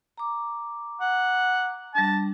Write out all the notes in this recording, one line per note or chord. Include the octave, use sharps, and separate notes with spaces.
A#5 D6
F#5
G3 D4 A5